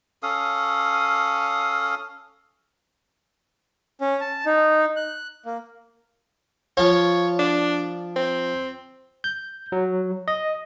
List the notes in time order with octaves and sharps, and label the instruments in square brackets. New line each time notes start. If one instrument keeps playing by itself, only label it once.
[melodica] C#4 A4 F5 D#6
[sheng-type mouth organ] C#4
A5
D#4
F#6
A#3
[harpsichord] F3 F4 [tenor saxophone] C#5
[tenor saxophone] D4
C4
[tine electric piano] G6
F#3
D#5